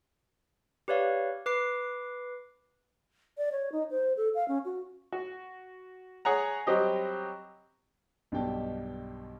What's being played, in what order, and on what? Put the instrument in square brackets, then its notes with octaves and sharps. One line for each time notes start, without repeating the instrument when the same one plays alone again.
[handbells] G4 B4 C#5 D5 F5
B4 D6 C7
[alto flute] D5
C#5
D#4
C5
A4
F5
C#4
F#4
[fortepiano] F#4
G#4 C#5 F#5 A#5
F#3 G3 C4 G4 D#5
[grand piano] B1 G2 B2 G4 G5 A5